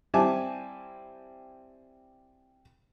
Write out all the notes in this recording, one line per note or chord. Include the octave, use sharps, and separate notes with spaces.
G3 C4 E4 G#5 A5 D6